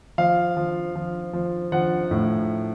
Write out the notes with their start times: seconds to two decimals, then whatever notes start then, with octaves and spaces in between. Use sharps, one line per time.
0.18 F3 F5
0.57 F3
0.95 F3
1.33 F3
1.72 F3 F#5
2.11 A2